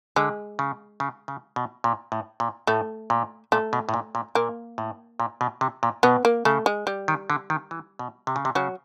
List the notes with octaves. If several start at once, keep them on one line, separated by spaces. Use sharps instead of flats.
D3 G#3
C#3
C#3
C#3
B2
A#2
A2
A#2
A2 A3
A#2
A#2 A3
B2
A2
A#2
A#2
A#2 A#3
A2
A#2
B2
C3
A#2
B2 B3
A#3
C#3 A3
G#3
G3
D#3
D3
D#3
E3
B2
C3
C#3
C3
C#3 F#3